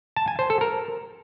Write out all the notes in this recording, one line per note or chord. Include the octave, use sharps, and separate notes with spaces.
A5
G#5
C5
A4
A#4